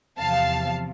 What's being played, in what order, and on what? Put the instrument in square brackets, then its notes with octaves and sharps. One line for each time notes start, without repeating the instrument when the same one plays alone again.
[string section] E2 C3 F3 F5 A5